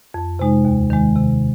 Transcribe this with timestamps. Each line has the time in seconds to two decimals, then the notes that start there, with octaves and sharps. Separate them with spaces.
0.14 F2
0.39 C3 G#3 D#4
0.65 D#2
0.90 D#3 G#3
1.16 C3